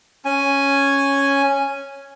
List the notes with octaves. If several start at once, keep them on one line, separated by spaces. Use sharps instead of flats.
C#4 G#5